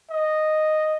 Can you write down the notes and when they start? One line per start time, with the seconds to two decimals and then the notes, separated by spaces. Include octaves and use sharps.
0.10 D#5